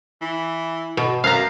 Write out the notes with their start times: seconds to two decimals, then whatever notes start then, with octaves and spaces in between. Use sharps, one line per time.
0.21 E3
0.97 B2
1.24 F#2 F5 A#5